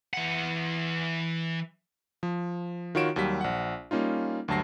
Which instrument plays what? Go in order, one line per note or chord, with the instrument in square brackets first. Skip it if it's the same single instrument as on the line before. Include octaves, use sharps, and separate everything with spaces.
[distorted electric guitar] E3 F#5
[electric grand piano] F3
D#3 F4 F#4 C#5 D7 E7
D#2 F#3 G3 B6
A#1 F#5
G3 A#3 C#4 D#4 F4
D2 G2 F#3 A5 A#6 C7